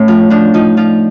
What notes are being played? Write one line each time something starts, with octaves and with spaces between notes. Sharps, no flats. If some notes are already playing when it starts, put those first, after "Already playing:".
Already playing: A2 C#4
F3
F3 D4
F3 D#4
F3 F4